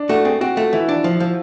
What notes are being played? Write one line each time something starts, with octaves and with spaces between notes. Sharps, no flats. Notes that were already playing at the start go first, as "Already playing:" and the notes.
Already playing: D4
A3 F#4
C4 G#4
C4 F#4
A3 F4
E3 E4
D4
F3
F3